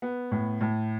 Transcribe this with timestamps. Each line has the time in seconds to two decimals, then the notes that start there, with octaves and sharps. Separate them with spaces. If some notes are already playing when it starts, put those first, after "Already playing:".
0.02 B3
0.32 A2
0.61 A2